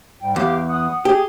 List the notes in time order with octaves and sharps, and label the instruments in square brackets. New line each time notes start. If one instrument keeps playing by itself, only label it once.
[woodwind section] G#2 G3 G5
[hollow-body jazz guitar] E2 [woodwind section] G4 F5 D6
[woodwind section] F#5 D#6
[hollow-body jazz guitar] G4 [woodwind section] G#4